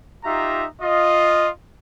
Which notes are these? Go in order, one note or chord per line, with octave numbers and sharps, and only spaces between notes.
D#4 F4 G4 E5 A#5
F4 D#5